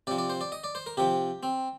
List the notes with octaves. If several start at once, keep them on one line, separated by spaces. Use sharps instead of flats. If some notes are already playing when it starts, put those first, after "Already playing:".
C3 F3 D5
D5
C5
D5
D#5
D5
C5
A#4
C3 F3 G4
C4